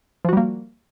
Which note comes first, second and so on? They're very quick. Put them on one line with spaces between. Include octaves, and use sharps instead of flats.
F3 F#4 G3 A#3